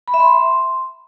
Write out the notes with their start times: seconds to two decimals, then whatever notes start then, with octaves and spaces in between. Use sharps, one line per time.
0.08 B5
0.14 E5
0.20 C6